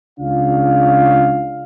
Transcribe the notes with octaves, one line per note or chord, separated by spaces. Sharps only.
C#2 C#3 D4 F4 F5